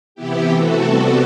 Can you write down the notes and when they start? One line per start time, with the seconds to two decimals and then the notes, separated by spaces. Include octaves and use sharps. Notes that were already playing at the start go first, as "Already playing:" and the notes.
0.15 C3 E3 B3 E4 G4
0.49 C3 E3 A3 F#4 A4
0.83 C3 G3 B3